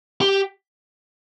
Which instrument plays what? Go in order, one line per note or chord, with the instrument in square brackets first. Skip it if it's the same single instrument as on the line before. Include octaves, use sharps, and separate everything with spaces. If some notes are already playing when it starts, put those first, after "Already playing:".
[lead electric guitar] G4